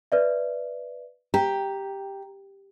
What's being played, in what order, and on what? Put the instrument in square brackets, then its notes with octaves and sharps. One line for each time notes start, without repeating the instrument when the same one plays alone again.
[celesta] B4 D5 E5
[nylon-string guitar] G4 [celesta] A#5